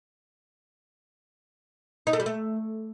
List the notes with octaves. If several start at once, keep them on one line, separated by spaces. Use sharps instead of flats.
D#4
A3
G3
A3